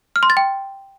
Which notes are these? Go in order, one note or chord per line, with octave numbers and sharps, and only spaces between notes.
F6
C6
A6
G5